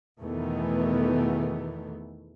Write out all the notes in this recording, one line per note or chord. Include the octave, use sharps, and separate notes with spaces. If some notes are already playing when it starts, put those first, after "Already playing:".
E2 B2 D#3 E3 A3 B3